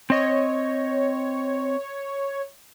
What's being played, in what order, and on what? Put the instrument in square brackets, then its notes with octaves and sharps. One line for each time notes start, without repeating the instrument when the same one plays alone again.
[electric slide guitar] C4 D#5 [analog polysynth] C#5